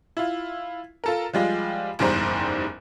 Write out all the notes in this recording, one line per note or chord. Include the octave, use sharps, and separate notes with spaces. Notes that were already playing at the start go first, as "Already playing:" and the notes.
E4 F4
F4 A4 A#4
F3 G3 G#3 F4
F#1 E2 G#2 G3 C5 A#5